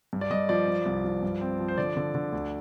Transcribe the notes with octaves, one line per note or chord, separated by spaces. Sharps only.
G2
D5
G2 D#5
F3 D5
F3
C2
F3
G2
C4
F3
C5
D3 D5
D3
D3
D2